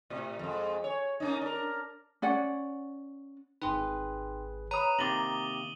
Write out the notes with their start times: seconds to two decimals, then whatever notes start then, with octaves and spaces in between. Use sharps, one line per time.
0.10 A2 C3
0.39 F2 G#3
0.84 C#5
1.20 A#3 C#4 D#4
1.41 D4 A#4
2.22 C#4 D5 F#5
3.62 G#1 D#4 G#4 B4 G5 C6
4.71 B4 C#5 A#5 B5 D#6 D#7
4.99 C3 D#3 A#3 D6 A6 A#6 F#7 G7